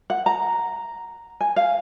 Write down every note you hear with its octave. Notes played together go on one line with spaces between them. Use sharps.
F#5
A#5
G#5
F5